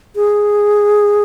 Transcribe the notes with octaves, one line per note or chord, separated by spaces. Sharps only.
G#4